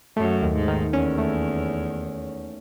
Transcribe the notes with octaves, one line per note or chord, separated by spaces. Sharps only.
F#2 A3
D#2
G#2
D#3
E2 C#4
A3